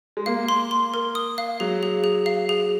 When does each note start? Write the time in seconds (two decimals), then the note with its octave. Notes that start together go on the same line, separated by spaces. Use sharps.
0.17 G#3
0.26 A#3 F5
0.49 C6
0.71 C6
0.94 A#4
1.15 D#6
1.38 F5
1.60 F#3 G#4
1.83 G#4
2.04 G#4
2.26 F5
2.49 G#4